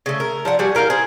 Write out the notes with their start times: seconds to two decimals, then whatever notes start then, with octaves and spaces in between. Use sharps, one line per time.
0.06 C#3 A3
0.20 A#4
0.45 F3 D4 F#5
0.59 G3 F#4 G#4
0.75 E4 A#4 F5 G5
0.90 G#4 C5